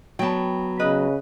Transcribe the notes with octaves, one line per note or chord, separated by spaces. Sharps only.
F#3 B3 G5 A5
C#3 B4 D#5